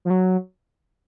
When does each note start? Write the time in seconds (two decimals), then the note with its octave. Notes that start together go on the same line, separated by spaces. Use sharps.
0.05 F3
0.10 F#3